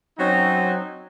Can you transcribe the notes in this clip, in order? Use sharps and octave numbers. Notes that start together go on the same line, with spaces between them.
F#3 C4 C#4 D#4